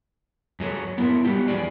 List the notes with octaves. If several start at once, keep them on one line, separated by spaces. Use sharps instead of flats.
F#2 F#3 G#4 A4 C#5
B3 E4 A#4
F#3 G3 B3 E4 G4
E2 G#2 G#4 D5